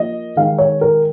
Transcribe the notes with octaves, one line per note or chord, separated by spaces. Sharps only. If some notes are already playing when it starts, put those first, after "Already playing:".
Already playing: F3 A#3 D#5
D#3 G#3 D#4 F5
C#5
A#4